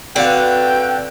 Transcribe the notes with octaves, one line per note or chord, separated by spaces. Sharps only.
D3 C4 F#4 B4 F5 G5